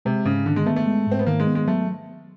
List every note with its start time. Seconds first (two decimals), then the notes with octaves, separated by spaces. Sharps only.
0.05 C3 G#3
0.26 G#2 C#3
0.46 D3 D#3
0.56 G#3
0.66 A3 B3
0.76 A3
0.87 G#3
1.07 G#2 C4
1.19 B3
1.27 D#3 A#3
1.40 G#3
1.47 B3
1.55 G#3
1.67 F#3 A3